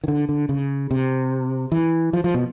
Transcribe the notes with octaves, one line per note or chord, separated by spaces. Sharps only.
D#3
D3
D3
C#3
C3
E3
F3
F3
B2